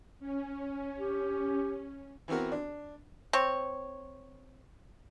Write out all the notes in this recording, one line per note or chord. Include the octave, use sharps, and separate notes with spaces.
C#4
G4
E3 B3 C4 F#4 A#4
D4
C4 C#5